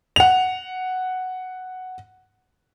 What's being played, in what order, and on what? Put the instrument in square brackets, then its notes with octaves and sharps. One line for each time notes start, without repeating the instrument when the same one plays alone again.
[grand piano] F#5 F7